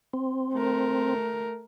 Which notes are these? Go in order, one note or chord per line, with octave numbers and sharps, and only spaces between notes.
C4
A3 A#4